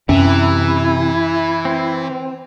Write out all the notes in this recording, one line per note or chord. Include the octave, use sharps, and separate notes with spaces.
F#2 C3 E3 C#4 E4
C4